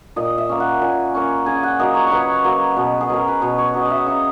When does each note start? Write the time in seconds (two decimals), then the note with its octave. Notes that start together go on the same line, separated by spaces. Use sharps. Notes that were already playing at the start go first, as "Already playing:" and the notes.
0.16 A#2 D#5
0.38 E5
0.49 A#3 C#4
0.60 F#5
0.81 A#2 G#5
1.15 A#3 C#4
1.46 C#3 G#5
1.63 F#5
1.79 F#3 A#3 D#5
1.95 C#5
2.07 C#3 B4 C#5
2.44 F#3 A#3
2.76 B2
3.01 G#4
3.09 F#3 C#4 A#4
3.28 B4
3.41 B2 C#5
3.58 C#5
3.74 F#3 C#4 D#5
3.85 D#5 E5
4.06 C#3 D#5